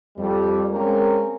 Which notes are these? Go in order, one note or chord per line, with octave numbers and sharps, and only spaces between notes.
F2 G3
G#3 A#3 C4 C#4 A#4